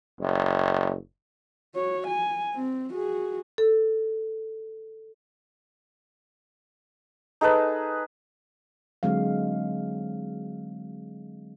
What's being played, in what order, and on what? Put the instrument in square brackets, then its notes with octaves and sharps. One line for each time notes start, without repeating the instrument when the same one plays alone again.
[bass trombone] F#1
[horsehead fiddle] F#4 C#5
G#5
C4
F#4 G#4
[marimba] A4
[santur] D#4 G#4 A4 B4
[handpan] D3 F#3 G#3 C4 F5